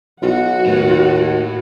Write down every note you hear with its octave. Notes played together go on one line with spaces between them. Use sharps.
B1 F#4 F#5
D#2 A2